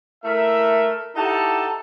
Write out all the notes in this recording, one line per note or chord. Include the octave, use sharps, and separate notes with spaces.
A3 E4 A#4 E5
D#4 E4 G4 A4 F#5 A5